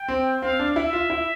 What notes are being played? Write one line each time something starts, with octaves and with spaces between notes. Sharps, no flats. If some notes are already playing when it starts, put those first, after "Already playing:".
Already playing: G5
C4
C4 F5
D4
E4 E5
F4
E4